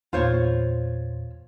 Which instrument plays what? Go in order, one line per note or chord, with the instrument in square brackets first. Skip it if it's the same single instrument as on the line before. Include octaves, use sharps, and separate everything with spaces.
[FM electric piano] E2 A#2 [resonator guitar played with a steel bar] F4 C5 C#5